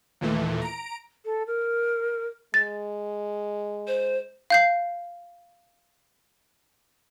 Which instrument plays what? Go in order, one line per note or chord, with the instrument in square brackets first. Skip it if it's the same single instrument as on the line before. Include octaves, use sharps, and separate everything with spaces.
[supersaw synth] D#2 A#2 E3 A3
A#5 D7
[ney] A4
A#4
[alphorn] G#3 [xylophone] A6
[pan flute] C5
[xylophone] F5 G6 C7